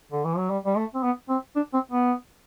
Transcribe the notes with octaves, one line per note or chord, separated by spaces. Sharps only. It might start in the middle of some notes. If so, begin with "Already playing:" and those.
D3
E3
F#3
G3
G3
A3
C4
B3
C4
D4
C4
B3